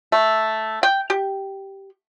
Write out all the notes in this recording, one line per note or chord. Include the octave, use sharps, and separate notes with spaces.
A3
G5
G4